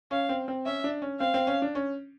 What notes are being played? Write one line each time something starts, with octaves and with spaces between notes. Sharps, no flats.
C#4 F5
C4
C4
C#4 E5
D4
C#4
C4 F5
C4
C#4
D4
C#4